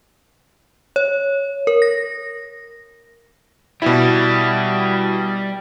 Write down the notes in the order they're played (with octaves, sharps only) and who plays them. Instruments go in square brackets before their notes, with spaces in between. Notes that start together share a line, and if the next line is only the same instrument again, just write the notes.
[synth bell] C#5
A#4
A#6
[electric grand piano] B2 E4 [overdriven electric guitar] G3